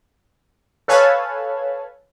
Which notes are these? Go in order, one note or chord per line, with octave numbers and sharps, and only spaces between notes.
A4 B4 C#5 F5 G#5 A5